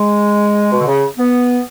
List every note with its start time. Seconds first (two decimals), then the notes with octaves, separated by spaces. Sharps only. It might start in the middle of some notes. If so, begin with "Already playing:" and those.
Already playing: G#3
0.72 B2
0.80 D3
0.87 C#3
1.17 B3